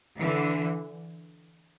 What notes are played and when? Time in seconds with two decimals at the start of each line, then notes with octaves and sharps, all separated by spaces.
0.19 D3 E3